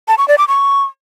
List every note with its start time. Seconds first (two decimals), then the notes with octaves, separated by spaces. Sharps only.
0.08 A5
0.18 C#6
0.28 D5
0.38 D6
0.48 C#6